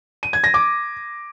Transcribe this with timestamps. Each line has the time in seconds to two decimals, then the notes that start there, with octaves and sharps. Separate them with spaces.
0.23 D#7
0.33 G#6
0.44 A#6
0.54 D6